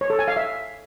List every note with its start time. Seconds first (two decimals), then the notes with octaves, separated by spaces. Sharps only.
0.01 C#5
0.10 A4
0.19 G#5
0.28 F5
0.37 E5